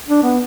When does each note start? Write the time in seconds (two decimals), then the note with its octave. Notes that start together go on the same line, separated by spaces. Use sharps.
0.09 D4
0.23 B3